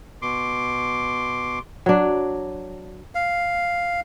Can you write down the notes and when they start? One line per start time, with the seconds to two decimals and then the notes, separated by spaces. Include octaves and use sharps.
0.22 B2 C6 D6
1.86 F#3 D4
3.15 F5